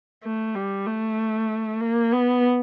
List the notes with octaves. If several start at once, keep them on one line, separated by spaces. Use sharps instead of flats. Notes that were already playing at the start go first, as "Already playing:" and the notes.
A3
G3
A3
A#3
B3